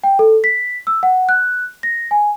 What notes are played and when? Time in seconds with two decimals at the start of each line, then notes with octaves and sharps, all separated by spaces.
0.04 G5
0.19 A4
0.44 B6
0.87 E6
1.03 F#5
1.29 F#6
1.83 A#6
2.11 G#5